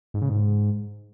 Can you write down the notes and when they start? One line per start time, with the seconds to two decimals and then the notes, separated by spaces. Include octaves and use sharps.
0.14 G#2
0.22 C#3
0.29 G#2